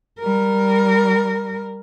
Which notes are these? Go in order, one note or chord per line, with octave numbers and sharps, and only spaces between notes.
G3 A#4